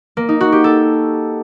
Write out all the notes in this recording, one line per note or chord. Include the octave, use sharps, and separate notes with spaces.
A#3
D#4
F#4
G4
A4